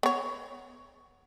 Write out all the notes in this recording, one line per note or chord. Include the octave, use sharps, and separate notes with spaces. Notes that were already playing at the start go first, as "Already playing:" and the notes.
B3 C#5